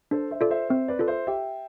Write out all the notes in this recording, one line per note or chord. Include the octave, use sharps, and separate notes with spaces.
D4 A4 C5
C5 E5
F4 A4 D5
C5 E5
C4 C5 E5
B4 D5
F4 A4
C5 E5
G4 E5 G5